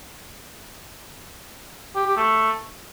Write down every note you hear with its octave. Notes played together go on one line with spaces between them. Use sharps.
G4
G4
A3